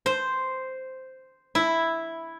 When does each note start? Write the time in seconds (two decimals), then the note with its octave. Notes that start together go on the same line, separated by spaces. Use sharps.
0.06 C5
1.55 E4